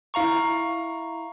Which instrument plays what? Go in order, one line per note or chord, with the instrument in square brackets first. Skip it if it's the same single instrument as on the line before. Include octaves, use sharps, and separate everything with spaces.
[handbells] E4 F5 A#5 C#6